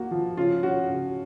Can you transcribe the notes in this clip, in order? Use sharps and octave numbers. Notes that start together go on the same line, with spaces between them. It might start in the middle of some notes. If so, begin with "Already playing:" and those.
Already playing: A#3 F#4
F3
C#3 F4
C#4 F#4
C#3